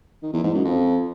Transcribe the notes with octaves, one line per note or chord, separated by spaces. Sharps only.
D#3
E2
G#2
F#2
F2